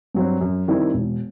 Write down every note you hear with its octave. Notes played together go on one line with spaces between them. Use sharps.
G2 F#3 C4
F#2
D#3 G3 C4 E4
E1